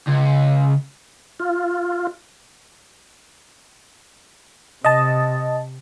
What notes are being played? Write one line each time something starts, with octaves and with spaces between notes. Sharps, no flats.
C#2
F4
C3 D#5 A5